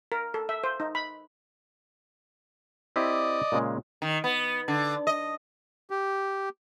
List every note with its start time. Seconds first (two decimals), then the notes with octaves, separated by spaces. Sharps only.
0.12 A#4
0.34 A4
0.49 E5
0.64 C5
0.80 D#4
0.95 B5
2.96 C4 E4 G4 D5 D#5
3.52 A#2 C#3 G#3
4.02 D#3
4.24 B3
4.68 D3
5.07 D#5
5.90 G4